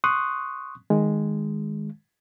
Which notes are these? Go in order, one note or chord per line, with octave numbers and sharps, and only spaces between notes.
C6 C#6 D#6 F#6
D#3 G#3